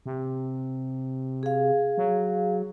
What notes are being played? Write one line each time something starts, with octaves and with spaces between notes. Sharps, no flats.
C3
G#4 F5
F#3